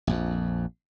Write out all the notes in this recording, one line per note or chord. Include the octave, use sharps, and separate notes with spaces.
A#1 F2